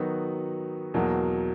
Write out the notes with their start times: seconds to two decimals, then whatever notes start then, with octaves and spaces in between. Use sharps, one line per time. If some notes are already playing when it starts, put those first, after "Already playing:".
Already playing: D#3 F#3 B3 D#4 F#4
0.94 E2 B2 F#3 A#3